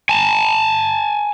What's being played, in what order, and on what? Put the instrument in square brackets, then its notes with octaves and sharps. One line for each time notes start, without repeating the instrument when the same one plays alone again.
[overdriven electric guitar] G#5 A5